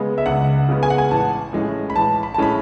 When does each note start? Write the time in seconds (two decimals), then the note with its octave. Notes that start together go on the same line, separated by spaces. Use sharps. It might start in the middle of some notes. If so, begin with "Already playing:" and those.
Already playing: C#3 G#3 B3
0.18 E5
0.26 C#2 F#5
0.69 C#3 G#3 B3
0.83 G#5
0.90 F#5
0.98 G#5
1.11 A1 A5
1.53 A2 G#3 C#4
1.90 B5
1.96 A1 A5
2.23 B5
2.34 A5
2.38 A2 G#3 C#4 B5